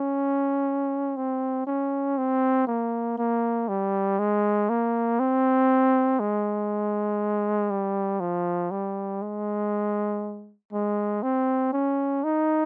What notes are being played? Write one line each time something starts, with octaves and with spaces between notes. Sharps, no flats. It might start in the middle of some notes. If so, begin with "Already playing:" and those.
Already playing: C#4
C4
C#4
C4
A#3
A#3
G3
G#3
A#3
C4
G#3
G3
F3
G3
G#3
G#3
C4
C#4
D#4